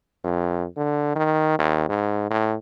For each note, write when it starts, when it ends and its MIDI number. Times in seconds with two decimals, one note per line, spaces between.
0.24 0.65 41
0.77 1.11 50
1.16 1.56 51
1.59 1.88 39
1.89 2.29 44
2.30 2.56 45